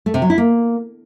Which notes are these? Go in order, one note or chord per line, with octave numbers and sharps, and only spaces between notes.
A3
C3
F#3
E4
A#3